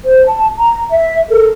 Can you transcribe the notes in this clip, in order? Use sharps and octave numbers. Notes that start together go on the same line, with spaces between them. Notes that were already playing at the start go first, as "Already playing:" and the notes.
C5
A5
A#5
E5
A4 A#4